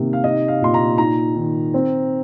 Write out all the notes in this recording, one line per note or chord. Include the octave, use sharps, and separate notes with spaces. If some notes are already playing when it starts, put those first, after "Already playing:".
Already playing: C3 D#3 A#3
F5
D#4 D#5
F5
A#2 C6
A#5
D#4 A#5
D#3
C4